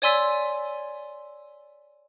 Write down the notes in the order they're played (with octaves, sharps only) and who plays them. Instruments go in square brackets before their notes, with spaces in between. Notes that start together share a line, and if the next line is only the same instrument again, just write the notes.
[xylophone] C#5 D5 G#5 C6 E6 B6